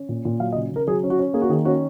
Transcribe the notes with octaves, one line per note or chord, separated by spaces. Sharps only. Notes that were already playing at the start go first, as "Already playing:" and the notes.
Already playing: C#4
A#2
A#2
F#3 F5
D#5
C#3
C#3 A#4
F#3 G#4
C#4
F#4
C#4
A#3 G#4
F#4
D#3 G#4
C#4 F#4